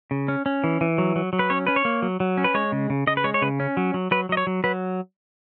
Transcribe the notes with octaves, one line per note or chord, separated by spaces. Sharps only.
C#3
C#4
C#4
E3
E3
F#3
F#3
F#3
B4
C#4 C#5
C#4 B4
C#5
A#3
F#3
F#3
C#4
B4
G#3 C#5
C#3
C#3
C#3 D#5
B4
G#3 C#5
C#5
C#3 B4
C#4
F#3
F#3
F#3 B4
F#3 D#5
C#5
F#3
F#3 B4